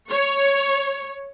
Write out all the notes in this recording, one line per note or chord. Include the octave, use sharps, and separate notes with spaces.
C#5